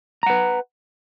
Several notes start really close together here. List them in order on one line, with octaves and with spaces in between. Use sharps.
A#5 F#5 B4